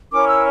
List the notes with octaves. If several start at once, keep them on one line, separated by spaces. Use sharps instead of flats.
C#4 E4 A#4 C#5 D6
E6